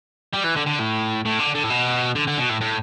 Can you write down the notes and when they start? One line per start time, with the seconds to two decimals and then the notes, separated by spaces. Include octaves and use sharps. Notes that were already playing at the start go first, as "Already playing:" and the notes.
0.34 G3
0.44 E3
0.57 D3
0.67 D3
0.80 A2
1.25 A2
1.39 D3
1.55 D3
1.63 A2
1.70 B2
2.15 D3
2.28 D3
2.39 B2
2.50 A2
2.61 A2